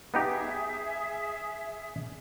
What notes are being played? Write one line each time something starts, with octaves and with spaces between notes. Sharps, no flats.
B3 D#4 G4 G#4 E5